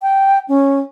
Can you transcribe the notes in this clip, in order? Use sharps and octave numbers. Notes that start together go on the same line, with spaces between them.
G5
C#4